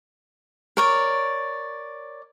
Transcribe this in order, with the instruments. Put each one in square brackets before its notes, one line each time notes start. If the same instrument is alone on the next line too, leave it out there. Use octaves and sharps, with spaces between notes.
[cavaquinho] A#4 C#5 D5